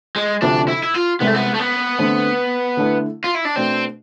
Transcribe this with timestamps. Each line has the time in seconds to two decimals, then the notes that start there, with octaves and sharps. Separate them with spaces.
0.16 G#3
0.42 D2 C3 F3 D4
0.68 E4
0.83 E4
0.94 F4
1.20 C2 C3 G#3 B3
1.27 A3
1.35 B3
1.54 A3
1.59 B3
1.99 D3 A3 C4
2.77 D3 A3 E4
3.24 F4
3.35 E4
3.45 D4
3.56 B2 A3 C4 D4